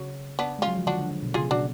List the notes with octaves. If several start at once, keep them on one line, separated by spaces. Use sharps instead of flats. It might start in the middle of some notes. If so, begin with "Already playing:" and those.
Already playing: C#3 F#3
B3 D4
G#3 C#4 F4
F#3
F3
D3 D4 F#4
D3
D3
B2
C#3 F4 G#4
B2 D4 F#4